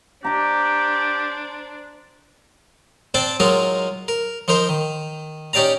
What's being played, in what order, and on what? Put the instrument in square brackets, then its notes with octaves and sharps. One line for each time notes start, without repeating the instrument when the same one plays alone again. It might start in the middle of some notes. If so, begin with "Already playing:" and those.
[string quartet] D4 C5 [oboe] G4 [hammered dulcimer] A#5 D6
[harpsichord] C4 D4 C5 D5 A5
F#3 G#3 D#4 F4 A#4
A#4
F3 D#4 A#4 C5
D#3
C#4 D#4 G4 D5 F5 A#5